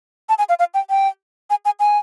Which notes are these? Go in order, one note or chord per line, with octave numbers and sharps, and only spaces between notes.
A5
G#5
F5
F5
G5
G5
G#5
G#5
G#5